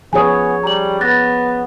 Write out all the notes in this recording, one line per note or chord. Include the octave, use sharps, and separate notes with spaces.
F3 B3 G#4 C#5 G#5 D#6
G3 A#5 F#7
B3 F#6 A6 A#6